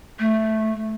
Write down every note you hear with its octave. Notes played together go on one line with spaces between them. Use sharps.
A3